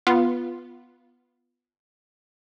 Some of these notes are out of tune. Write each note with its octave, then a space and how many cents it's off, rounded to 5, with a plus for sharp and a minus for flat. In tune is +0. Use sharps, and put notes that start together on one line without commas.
B3 +0 F4 +0